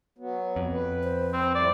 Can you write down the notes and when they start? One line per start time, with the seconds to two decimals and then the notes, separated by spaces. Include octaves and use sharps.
0.18 F#3 B3
0.56 F2
0.73 B4
1.03 C5
1.33 C4
1.55 A2 G3 A3 D5